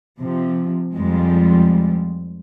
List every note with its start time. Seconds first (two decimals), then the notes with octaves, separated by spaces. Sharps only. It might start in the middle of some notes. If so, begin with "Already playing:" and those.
0.20 C3 F3
0.95 F2 F3 G3 G#3